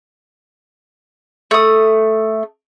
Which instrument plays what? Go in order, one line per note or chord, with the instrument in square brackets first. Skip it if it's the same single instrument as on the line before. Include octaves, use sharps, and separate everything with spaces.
[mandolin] A3 D#6